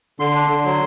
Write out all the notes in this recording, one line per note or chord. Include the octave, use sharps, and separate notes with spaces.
D3 C6
D4
D3
F#3